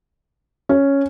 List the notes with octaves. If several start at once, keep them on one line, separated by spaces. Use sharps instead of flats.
C#4